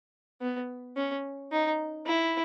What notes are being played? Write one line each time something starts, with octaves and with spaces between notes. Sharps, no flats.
B3
C#4
D#4
E4